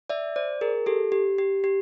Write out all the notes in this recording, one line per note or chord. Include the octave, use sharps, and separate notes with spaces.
D5 E5
C5 D5
G#4 A#4
G4 A4
G4
G4
G4